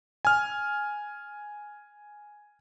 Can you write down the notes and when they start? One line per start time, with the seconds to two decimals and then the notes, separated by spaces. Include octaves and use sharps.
0.25 G#5 F6